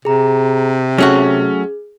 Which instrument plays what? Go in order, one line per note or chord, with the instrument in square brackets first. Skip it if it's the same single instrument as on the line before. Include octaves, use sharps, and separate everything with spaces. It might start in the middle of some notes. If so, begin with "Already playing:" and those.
[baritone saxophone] C3 [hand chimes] G#4 A#5
[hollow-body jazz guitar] F#3 A3 F#4 [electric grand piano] C#4 [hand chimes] G#4